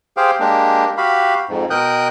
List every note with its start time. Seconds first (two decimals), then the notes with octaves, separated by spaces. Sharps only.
0.17 G4 G#4 C5 F5 G5
0.40 G#3 A#3 D4 G4
0.97 F#4 G4 F5 B5
1.49 F2 G#2
1.70 B2 A#4 G5 D#6 F#6 G6